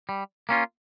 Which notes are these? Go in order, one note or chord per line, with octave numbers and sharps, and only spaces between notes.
G3
A#3 C#4 F4